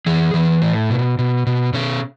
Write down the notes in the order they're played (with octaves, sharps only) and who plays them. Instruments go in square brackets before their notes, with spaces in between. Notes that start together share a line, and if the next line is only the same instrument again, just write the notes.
[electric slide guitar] E3 G#4
E3
A2
B2
B2
B2
B2 C#4